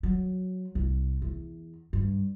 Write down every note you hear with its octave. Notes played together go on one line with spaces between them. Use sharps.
F#3
C2
E2
G2